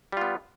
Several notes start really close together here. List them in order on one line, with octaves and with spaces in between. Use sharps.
G3 F4 B3